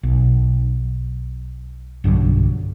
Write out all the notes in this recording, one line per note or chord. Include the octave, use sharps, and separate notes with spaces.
B1
B1 G2 D3 F#3